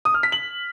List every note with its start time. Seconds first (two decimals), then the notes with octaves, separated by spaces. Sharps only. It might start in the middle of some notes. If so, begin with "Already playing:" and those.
0.05 D#6
0.14 F6
0.23 B6
0.32 F#7